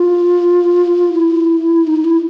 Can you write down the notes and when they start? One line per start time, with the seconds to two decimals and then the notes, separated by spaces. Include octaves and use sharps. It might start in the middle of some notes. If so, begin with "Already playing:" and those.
Already playing: F4
1.13 E4
1.87 D#4
2.04 E4